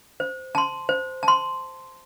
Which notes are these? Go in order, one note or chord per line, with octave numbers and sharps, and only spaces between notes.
C5
A5 C6
C5
A5
C6